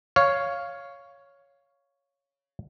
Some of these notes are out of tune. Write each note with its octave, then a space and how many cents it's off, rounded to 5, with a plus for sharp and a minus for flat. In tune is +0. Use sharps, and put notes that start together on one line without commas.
C#5 +5 F5 +0